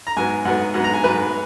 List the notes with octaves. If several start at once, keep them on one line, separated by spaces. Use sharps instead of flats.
A#5
G#2 F#3 B3 G#5
G#2 F#3 B3 F#5
G#2 F#3 B3 F#5
A#5
G#5
G#2 F#3 B3 B4